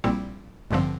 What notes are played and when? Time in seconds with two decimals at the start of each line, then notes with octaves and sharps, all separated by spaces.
0.04 A#1 A#2 G3 C4 E4
0.71 A1 G2 D3 F3 C4